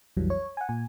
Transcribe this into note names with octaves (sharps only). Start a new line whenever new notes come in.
B1 F2 E3 F#3 G3
C#5
F#5 G#5
A#2 G#5